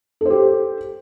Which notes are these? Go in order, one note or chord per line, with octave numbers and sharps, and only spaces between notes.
G4 A4 C5